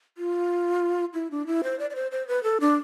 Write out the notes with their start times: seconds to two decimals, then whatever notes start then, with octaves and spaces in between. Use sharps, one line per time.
0.18 F4
1.14 E4
1.31 D4
1.47 E4
1.64 C5
1.79 D5
1.90 D5
1.95 C5
2.11 C5
2.28 B4
2.43 A4
2.61 D4